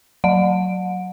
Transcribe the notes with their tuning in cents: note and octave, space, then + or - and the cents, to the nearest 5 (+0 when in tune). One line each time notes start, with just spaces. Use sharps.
F#3 +0 F#5 -30